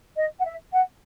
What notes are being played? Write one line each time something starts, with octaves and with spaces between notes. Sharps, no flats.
D#5
F#5
E5
F#5